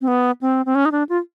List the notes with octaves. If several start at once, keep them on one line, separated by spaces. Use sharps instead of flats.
C4
B3
C4
C4
C#4
D#4
D4
F4